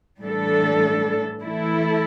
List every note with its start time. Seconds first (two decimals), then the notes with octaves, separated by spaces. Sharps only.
0.20 A2 E3 G3 D4 A4
1.41 E3 A3 E4 A4